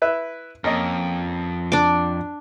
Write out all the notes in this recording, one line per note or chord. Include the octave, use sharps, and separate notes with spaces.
E4 B4 E5
F2 A#3 C#4 D#5
D4 D6